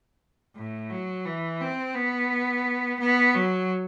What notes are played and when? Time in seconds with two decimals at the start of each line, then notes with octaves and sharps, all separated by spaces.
0.56 A2
0.90 F#3
1.25 E3
1.61 C4
1.95 B3
3.00 B3
3.34 F#3